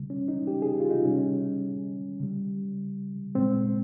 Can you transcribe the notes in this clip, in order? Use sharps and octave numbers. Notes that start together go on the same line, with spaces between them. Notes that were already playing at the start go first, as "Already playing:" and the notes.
Already playing: C#3 G3
C#4
D#4
G4
G#4
F4
D#4
C3 G3 C#4
C#3 G3
A#2 G#3 C4